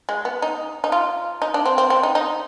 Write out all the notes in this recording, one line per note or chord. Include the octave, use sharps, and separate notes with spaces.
G#3
B3
D#4
D#4
F4
D#4
D4
C4
C4
C4
D#4
D#4